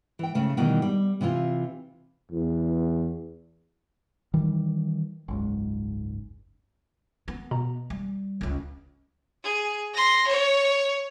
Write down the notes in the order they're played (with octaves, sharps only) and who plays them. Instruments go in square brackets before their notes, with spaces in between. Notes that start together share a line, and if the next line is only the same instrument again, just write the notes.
[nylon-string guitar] E3 G5
C#3 A3
B2 D#3 E3 G3
G3
C3 E3 E4 F4
[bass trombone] E2
[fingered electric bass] D#3 E3 G3
F#1 C#2 G#2
[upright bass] B3
[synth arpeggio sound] B2 A#5
[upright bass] G3
C#2 C#4
[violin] G#4
C6 A#6
C#5